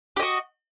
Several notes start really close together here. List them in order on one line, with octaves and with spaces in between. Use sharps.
G4 D#5 F#4